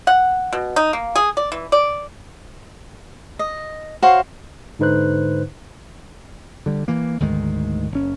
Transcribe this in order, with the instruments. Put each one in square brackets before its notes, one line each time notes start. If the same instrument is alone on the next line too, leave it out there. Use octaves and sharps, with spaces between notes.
[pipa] F#5
B2
D#4
A#3
G#4
D5
E3
D5
[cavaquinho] D#5
F#4 C5 C#5 F5
[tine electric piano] G#2 D3 D#4 B4 C5 F#6
[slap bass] D3 G3
E3 A#3
D2 G#2 D#3 G#3
F#1 C#4